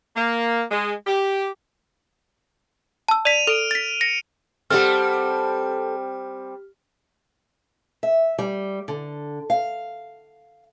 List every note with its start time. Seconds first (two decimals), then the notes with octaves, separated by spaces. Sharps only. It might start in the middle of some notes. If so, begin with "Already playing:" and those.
0.16 A#3
0.71 G#3
1.07 G4
3.09 A5 E6
3.25 D5 B6 D#7 F7
3.47 A4 F6 D7
3.71 A6 B6
4.01 A#6 C#7
4.70 G3 C4 G4 A4 F#5 A5 F6
8.03 E5
8.38 G3
8.88 D3
9.50 F5